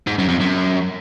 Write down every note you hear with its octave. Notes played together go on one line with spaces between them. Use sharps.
G#2
F#2
F2
F#2